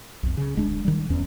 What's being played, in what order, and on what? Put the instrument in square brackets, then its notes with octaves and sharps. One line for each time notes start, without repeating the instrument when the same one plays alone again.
[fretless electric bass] B1 F2
C#3
D1 G#3 D4
D#3 G3
D1 E2 C#4